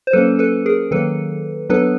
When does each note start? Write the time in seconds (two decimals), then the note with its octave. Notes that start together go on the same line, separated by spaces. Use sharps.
0.07 C5
0.13 F#3 A#3 C#4 A4 B4
0.39 A4 B4
0.66 G#4 A#4
0.91 D#3 F#3 A#3 A4 B4
1.69 F#3 B3 D4 A4 B4